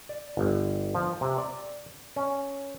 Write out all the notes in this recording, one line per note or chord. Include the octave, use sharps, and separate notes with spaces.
D5
G1
F3
C3
D5
C#4